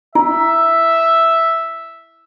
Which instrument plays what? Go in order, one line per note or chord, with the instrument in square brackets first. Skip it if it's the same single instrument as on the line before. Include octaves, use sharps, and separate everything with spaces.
[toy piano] E4 [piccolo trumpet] E5